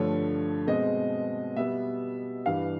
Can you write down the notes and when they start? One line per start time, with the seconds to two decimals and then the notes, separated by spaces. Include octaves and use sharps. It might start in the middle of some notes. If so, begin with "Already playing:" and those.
Already playing: G2 D3 F3 A3 C#5
0.67 B2 G#3 C4 D#5
1.56 B2 G3 B3 E5
2.46 G2 E3 G3 F5